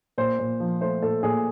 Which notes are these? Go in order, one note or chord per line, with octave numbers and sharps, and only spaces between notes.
A#2 C5
A#2
F3
A3 C5
A#2 A4
A#2 G#4